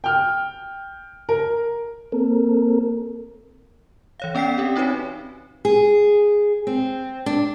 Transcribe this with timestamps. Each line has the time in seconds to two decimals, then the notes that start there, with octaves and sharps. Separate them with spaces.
0.04 G5 F6
1.29 A#4
2.12 A#3 C4 A4 A#4
4.20 E3 C#5 F5
4.35 B3 C#4 D5 G5 B6 C7
4.58 C4 G4
4.76 C4 D#4 F#4 B4 C#5
5.65 G#4
6.67 C4
7.26 D4